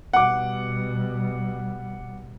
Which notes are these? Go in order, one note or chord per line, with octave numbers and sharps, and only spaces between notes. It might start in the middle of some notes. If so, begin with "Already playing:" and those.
B2 G3 F#5 D6